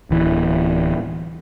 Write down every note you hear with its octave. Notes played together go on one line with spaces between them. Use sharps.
D1 E3